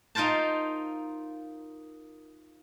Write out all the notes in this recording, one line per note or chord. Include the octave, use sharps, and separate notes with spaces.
D#4 F4 A#4 C5 A5